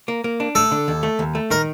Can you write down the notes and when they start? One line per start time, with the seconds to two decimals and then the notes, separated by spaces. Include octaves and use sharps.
0.08 A#3
0.24 A#3
0.40 D4
0.55 A3 A4
0.71 D3
0.88 D#2
1.03 A3
1.19 D#2
1.35 A3
1.50 D#3 A#4